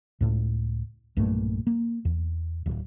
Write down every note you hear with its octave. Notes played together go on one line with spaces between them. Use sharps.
C#2 A2
B1 G2 A#2 A3
A#3
E2
D1